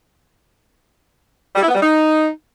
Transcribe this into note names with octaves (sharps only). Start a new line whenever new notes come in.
G3
E4
B3
G3
D#4